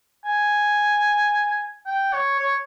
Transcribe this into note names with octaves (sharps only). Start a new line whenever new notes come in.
G#5
G5
C#5
C#5